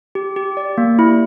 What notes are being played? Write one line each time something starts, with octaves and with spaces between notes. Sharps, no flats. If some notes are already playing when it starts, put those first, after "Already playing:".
G4
G4
D5
A#3
E4